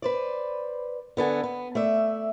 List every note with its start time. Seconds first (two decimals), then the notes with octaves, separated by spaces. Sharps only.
0.02 B4 C5 D5
1.17 D3 B3 A4 G#5
1.43 B3
1.75 A3 D5 E5